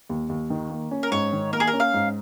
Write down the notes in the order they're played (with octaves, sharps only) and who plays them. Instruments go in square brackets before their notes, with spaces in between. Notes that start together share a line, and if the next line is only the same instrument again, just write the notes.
[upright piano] D#2
D#2
D#3
A#3
C#4
[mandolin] A#4
[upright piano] G#2 [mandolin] C#5
[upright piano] D#3
[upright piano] A#3 [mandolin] A#4
[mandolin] G#4
A#4
[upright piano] C#4
[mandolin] F5
[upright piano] G#2